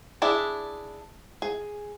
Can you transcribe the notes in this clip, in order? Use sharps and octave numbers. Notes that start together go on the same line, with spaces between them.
D4 E4 G#4 D5 E5
G#4